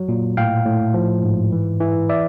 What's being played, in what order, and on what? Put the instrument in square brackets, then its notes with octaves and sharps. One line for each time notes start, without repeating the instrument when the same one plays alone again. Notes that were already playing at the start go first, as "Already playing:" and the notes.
Already playing: [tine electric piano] F#3
A#2
A2 F5 G5
A2
F3
G#2
E3
E3
D5 E5